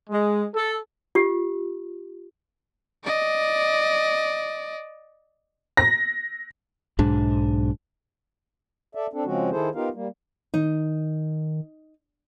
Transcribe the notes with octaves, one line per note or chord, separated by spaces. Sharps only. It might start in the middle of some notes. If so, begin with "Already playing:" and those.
G#3
A4
F4 G4
D5 D#5
A#6
B1 G#2 D4
A4 D5 E5
C4 D4 A4
C#3 F3 G#3 C4 C#4 F#4
D#3 E4 G#4 A4 C5
B3 D#4 F4 G4 A#4 F5
G3 A#3
D#3 D#4